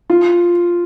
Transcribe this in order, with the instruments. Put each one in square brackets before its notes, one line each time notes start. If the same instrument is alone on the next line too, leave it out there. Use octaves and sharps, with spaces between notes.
[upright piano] F4